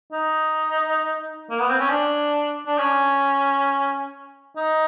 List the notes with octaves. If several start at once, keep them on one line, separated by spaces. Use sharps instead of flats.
D#4
A#3
B3
C4
C#4
D4
D4
C#4
D#4